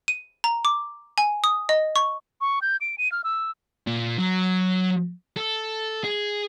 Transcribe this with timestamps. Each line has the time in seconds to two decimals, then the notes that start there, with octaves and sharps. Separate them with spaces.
0.08 D#7
0.44 A#5
0.65 D6
1.18 G#5
1.44 D#6
1.69 D#5
1.96 C#6
2.41 C#6
2.62 G6
2.81 D7
2.98 D#7
3.12 F6
3.24 E6
3.87 A#2
4.18 F#3
5.36 A4
6.04 G#4